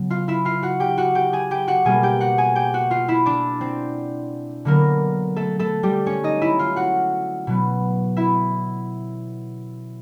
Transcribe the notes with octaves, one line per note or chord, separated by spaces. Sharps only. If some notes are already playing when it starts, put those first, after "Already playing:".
Already playing: C#3 F#3 B3
F4 F5
E4 E5
F4 F5
F#4 F#5
G4 G5
F#4 F#5
G4 G5
G#4 G#5
G4 G5
F#4 F#5
B2 G3 A#3 G#4 G#5
G4 G5
F#4 F#5
G#4 G#5
G4 G5
F#4 F#5
F4 F5
E4 E5
D4 D5
C4 C5
D3 F#3 A#3 B3 A#4
A3 A4
A3 A4
G3 G4
C#4 C#5
D#4 D#5
E4 E5
F4 F5
F#4 F#5
B2 F#3 B3
E4 E5